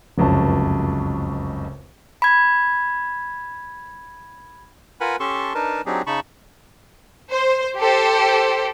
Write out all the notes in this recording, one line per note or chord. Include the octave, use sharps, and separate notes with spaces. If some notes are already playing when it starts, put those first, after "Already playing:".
F1 C#2 F#2 A5
B5 G#6
F4 A#4 B4 F#5 G#5 B5
C#4 G4 A4 A5 C6 C#6
D4 D#4 A#4 B4 A5
F#3 C4 D4 D#4 G4 G#4
C#3 D#4 A5 B5 C#6
C5
G4 A4 C5